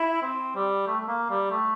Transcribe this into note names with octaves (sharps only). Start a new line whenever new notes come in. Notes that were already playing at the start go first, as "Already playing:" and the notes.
Already playing: E4
C4
G3
A3
A3
A#3
G3
A3